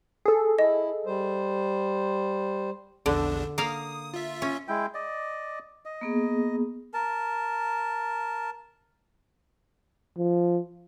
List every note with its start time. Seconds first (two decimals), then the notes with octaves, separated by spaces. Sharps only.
0.25 G#4 A4
0.59 E4 D#5
1.06 G3 C5
3.06 A#1 E2 D3 D4
3.58 A#3 F5 D#6
4.14 F4 E5
4.42 C#4
4.68 G#3 E4 G5
4.94 D5 D#5
5.85 D#5
6.01 A#3 B3 G#4
6.94 A#4 A5
10.18 F3